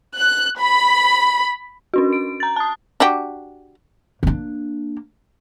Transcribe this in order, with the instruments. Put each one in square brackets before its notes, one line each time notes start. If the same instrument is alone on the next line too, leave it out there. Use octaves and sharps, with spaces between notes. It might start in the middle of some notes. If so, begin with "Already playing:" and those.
[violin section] F#6
B5
[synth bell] C#4 D4 F#4
D7
A#5 A6
A5 D#6
[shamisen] D4 F#4 G4
[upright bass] A#3 D4